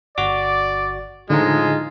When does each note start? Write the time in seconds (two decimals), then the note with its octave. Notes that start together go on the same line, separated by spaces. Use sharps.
0.18 G1 F#4 D5 D6
1.30 A2 D3 F3 G#3 D#4 F4 A#5